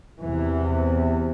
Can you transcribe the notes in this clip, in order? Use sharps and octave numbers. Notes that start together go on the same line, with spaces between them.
E2 C3 E3